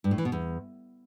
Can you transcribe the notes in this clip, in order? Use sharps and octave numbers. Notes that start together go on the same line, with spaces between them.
G2
A2
E3
B2
E2